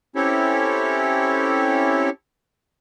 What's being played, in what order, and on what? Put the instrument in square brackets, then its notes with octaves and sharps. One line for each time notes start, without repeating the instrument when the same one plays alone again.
[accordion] C4 C#4 E4 G4 A4 C#5